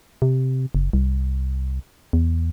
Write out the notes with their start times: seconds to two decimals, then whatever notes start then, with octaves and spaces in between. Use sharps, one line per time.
0.22 C3
0.75 F#1
0.93 C2
2.13 E2